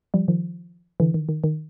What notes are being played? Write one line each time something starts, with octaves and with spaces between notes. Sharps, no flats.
F3 G3
D#3 F3
D3 E3
D#3
D#3
D#3